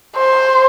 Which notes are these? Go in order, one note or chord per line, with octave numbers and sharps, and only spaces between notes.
C5